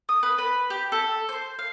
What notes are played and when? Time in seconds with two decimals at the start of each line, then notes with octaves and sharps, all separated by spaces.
0.09 D#6
0.23 B4
0.38 B4
0.70 G4
0.92 A4
1.29 C5
1.59 F5